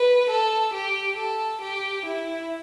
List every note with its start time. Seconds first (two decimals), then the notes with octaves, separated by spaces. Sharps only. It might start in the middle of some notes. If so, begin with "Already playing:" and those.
Already playing: B4
0.30 A4
0.74 G4
1.16 A4
1.61 G4
2.05 E4